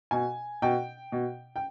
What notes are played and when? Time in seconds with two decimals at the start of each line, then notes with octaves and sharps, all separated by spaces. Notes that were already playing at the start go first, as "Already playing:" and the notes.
0.11 B2 G#5
0.62 B2 G5
1.12 B2
1.56 G5